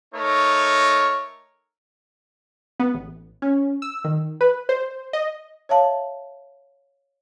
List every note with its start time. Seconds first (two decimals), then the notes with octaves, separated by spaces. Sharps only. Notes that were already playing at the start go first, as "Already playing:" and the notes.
0.15 A3 D#4 A#4 C#5
2.80 B3
2.94 A1
3.42 C#4
3.82 E6
4.04 D#3
4.41 B4
4.69 C5
5.13 D#5
5.69 C#5 E5 F5 A5